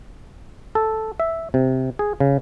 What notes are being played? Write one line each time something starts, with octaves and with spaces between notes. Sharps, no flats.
A4
E5
C3
G#4
C#3